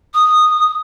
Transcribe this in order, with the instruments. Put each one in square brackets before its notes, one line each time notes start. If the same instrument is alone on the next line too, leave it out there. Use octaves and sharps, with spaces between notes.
[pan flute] D#6